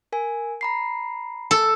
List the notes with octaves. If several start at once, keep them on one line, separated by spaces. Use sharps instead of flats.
A#4 G#5
A#5 B5 C7
A4